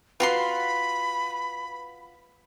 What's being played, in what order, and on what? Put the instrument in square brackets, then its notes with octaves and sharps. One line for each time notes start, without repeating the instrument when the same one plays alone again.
[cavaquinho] F4 F#4 C6 [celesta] B4 [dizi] B5